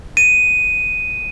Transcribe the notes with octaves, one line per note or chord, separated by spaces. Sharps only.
D#7